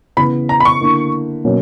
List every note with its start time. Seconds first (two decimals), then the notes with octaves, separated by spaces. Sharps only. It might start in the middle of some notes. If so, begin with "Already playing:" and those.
0.17 C#3 E3 B3 E4 B5
0.49 A#5
0.60 B5
0.65 C#6
0.81 D3 A#3 E4
1.44 B2 F#3 A#3 C#4